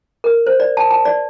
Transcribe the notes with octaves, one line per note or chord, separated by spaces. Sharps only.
A#4
C5
D5
A5
A5
D5